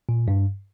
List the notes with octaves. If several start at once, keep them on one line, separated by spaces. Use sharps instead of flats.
A#2
G2